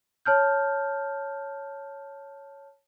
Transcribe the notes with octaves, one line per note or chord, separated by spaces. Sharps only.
C#5 A5 F6 G6